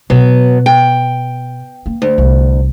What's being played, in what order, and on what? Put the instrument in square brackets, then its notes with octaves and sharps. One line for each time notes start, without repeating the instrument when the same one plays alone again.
[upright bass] B2 C4 [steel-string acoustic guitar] F#3 B3
[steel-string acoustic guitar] G5
[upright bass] A#3
[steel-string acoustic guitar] D2
[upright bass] C2